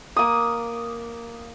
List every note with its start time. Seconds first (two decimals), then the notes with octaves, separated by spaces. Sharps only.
0.16 A#3 D#6